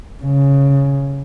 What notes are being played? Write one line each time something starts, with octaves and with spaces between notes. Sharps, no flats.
C#3